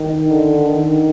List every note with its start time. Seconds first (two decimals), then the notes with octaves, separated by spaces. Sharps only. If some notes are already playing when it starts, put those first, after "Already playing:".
Already playing: D#3
0.30 D3
0.67 D#3